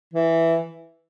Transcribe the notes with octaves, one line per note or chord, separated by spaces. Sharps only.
E3